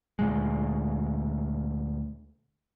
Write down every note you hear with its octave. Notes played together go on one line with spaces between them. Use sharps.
D2 A#2 G#3